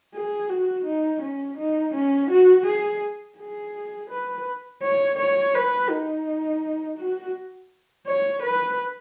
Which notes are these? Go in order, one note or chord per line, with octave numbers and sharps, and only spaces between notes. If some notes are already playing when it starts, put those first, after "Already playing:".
G#4
F#4
D#4
C#4
D#4
C#4
F#4
G#4
G#4
B4
C#5
C#5
B4
D#4
F#4
C#5
B4